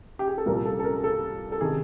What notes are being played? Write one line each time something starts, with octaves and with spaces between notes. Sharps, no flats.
G4
G#4
A4
C2 A#2 F3 A#4
A4
A4
A#4
A4
A4
C3 D#3 G#4